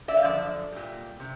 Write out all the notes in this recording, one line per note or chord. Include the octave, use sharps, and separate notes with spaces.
D5 E5
F5
F#2 D3 F3 D5 E5
A#2 G3
C3